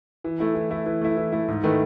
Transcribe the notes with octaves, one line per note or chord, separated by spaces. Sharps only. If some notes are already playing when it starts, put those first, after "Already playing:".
E3
A3 E4
E3
A3 E4
E3
A3 E4
E3
A3 E4
G#2
D#3 A3 E4 B4